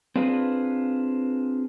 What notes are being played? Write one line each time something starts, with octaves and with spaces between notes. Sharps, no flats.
C4 D4 F4 G#4 B4 C5